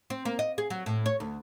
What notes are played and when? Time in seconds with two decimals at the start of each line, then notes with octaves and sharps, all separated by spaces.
0.10 C4
0.25 A#3
0.39 D#5
0.58 G#4
0.70 F#3
0.86 A2
1.06 C#5
1.20 D2